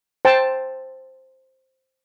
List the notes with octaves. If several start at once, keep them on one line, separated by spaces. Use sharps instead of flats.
C5 G5 A5